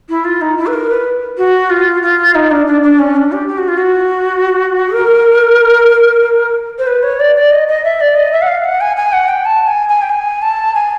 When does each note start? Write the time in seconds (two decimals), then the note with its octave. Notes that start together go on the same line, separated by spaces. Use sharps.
0.09 E4
0.24 F4
0.41 D#4
0.57 E4
0.67 B4
0.73 A#4
0.90 B4
1.37 F#4
1.70 F4
2.02 F4
2.35 D#4
2.51 D4
2.66 D4
2.83 D4
2.99 C#4
3.16 D4
3.32 G4
3.48 G4
3.58 F#4
3.68 F4
3.77 F#4
4.93 A#4
6.79 C5
6.87 B4
7.03 C#5
7.20 D5
7.35 D5
7.51 D#5
7.68 D#5
7.84 E5
8.00 D5
8.16 D#5
8.32 E5
8.42 F#5
8.48 F5
8.64 F#5
8.81 G#5
8.97 G#5
9.13 F#5
9.28 G5
9.45 A5
9.67 G#5
9.89 G#5
10.02 G5
10.10 G#5
10.42 A5
10.74 G#5